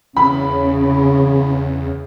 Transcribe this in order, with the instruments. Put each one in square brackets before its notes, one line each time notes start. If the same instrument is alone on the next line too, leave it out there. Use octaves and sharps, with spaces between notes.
[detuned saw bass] E2 [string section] C#3 [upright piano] B5